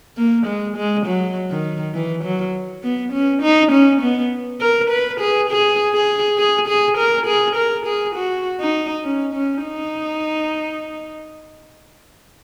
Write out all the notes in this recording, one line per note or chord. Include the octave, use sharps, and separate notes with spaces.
A#3
G#3
G#3
F#3
D#3
E3
F#3
B3
C#4
D#4
C#4
B3
A#4
B4
G#4
G#4
G#4
G#4
G#4
A#4
G#4
A#4
G#4
F#4
D#4
C#4
C#4
D#4